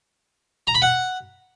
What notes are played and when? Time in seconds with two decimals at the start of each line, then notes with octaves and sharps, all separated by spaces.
0.67 A#5
0.75 B5
0.82 F#5